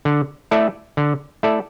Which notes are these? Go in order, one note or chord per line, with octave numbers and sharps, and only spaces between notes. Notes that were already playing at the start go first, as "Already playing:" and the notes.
D3
A3 E4 A4 D5
D3
A3 E4 A4 D5